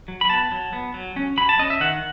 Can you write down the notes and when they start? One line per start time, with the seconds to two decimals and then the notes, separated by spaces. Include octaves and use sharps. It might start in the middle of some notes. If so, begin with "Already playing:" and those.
0.08 F#3
0.21 B5
0.29 B3 A5
0.52 F#3
0.73 B3
0.94 F#3
1.16 C#4
1.38 F#3 B5
1.49 A5
1.59 C#4 D#5
1.70 E5
1.81 D#3 F#5